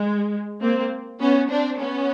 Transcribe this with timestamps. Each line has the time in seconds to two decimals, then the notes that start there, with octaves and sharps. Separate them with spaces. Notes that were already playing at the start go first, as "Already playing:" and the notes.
Already playing: G#3
0.62 A#3 C4
1.20 B3 C#4
1.50 C4 D4
1.79 B3 C#4